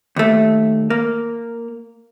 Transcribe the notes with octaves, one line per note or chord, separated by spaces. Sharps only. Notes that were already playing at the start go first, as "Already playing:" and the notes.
D#2 A3
A#3